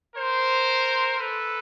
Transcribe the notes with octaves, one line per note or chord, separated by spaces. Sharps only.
A#4 C5
A4 B4